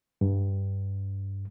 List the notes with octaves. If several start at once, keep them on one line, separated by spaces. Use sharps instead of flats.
G2